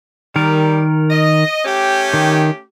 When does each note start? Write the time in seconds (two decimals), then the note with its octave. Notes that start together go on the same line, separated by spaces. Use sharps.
0.36 D#3 G3 A#4
1.11 D#5
1.65 A3 C#4 G4
2.14 D#3